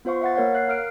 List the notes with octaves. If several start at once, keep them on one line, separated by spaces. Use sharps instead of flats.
B3 F4 C5 F5 C#6
E5 F#5 A6
A#3 A#4 C#5 F5 F#5
F#6 C7
A#4 F5 F6 F#6 D7